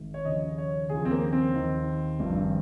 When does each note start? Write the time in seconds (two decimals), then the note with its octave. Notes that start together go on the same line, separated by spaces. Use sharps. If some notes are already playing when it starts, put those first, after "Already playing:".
Already playing: G#1 G#2
0.14 C#5
0.25 D#2 C#3 F3 D#5
0.58 C#5
0.89 D#2 C#3 F3 G#4
1.05 C4
1.11 A#3
1.32 C4
1.55 D#2 D#3
2.19 G#1 G2 F3